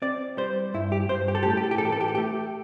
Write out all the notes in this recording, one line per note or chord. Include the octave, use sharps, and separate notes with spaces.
C4 D5
G3 C5
G2 E4
G4
G2 C5
G4
A4
G4
A2 A4
G4
A4
G4
A4
E3 G4
A4
G4
A4
A3 G4